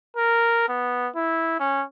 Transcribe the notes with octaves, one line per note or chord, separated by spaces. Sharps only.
A#4
B3
E4
C#4